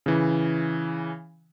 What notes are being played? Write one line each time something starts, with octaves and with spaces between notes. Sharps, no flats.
C#3 E3